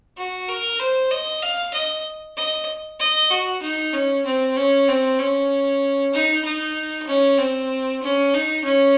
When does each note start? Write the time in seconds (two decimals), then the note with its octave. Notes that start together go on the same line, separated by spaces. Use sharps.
0.17 F#4
0.49 A#4
0.80 C5
1.11 D#5
1.43 F5
1.74 D#5
2.37 D#5
3.00 D#5
3.30 F#4
3.62 D#4
3.93 C#4
4.25 C4
4.57 C#4
4.88 C4
5.19 C#4
6.13 D#4
6.44 D#4
7.07 C#4
7.38 C4
8.02 C#4
8.33 D#4
8.64 C#4